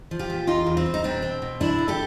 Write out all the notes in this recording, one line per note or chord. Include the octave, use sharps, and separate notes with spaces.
F3
F4 G4
A#2
E2 D#4 F4
E2
C4
E2
D#4
B2 C4 D4
C4
B2
F#2 D4 E4
D3
G4 A4